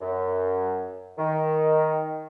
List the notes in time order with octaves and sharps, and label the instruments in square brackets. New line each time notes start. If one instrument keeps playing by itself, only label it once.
[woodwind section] F#2
D#3